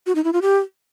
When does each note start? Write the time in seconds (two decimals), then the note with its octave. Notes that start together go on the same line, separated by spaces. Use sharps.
0.06 F#4
0.15 D#4
0.24 E4
0.33 F4
0.42 G4